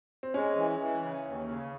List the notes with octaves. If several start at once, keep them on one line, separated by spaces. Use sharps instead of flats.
C4
G#3 C#4
E3
E3
C#3
D#2
C#3